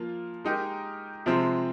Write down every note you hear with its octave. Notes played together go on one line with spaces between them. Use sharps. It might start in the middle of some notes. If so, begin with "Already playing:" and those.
Already playing: F3 A#3 F4
G#3 D#4 G4 A#4
C3 F3 G#3 C4